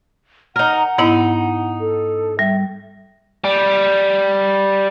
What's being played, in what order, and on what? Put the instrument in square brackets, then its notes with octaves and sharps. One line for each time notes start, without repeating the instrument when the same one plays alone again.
[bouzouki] D#4 A#4 [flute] F#5
[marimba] G#2 B3 E4 [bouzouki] D#4
[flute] A4
[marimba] G3 [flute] E5
[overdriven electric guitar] G3